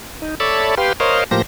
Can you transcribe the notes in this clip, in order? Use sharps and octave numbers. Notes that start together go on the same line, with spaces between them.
D#4
A4 C#5 D5 E5 A5 B5
G4 B4 F5 G5 C6
A#4 C5 C#5 D#5 F5
A2 F3 A#3 G4 C5 A#6